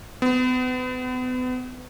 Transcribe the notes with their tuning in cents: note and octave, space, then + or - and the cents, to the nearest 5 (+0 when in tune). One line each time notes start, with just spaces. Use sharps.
B3 +35